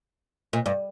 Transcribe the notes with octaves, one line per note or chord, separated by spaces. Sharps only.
A#2
G2